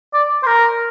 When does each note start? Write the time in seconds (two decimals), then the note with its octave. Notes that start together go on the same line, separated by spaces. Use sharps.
0.14 D5
0.43 C5
0.46 A#4